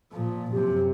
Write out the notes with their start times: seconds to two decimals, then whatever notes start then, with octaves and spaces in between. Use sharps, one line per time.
0.12 A#2 F3
0.52 F#2 C3 G4